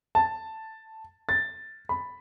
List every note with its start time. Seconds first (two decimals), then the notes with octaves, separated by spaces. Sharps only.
0.15 A5
1.29 A6
1.89 B5